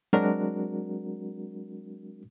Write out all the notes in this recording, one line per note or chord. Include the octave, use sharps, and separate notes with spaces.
F#3 G#3 C4 D4 F#4 A#4